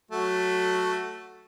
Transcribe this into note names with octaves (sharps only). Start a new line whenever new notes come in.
F#3 A3 F#4